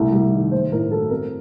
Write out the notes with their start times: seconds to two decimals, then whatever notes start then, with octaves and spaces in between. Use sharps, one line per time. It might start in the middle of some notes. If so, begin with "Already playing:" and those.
Already playing: C2 A3
0.12 G3
0.32 D#3
0.51 A3 C5
0.72 A2 A#4
0.91 F#3 A4
1.10 C4 A#4